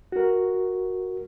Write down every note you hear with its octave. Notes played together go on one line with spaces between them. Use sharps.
F#4 A#4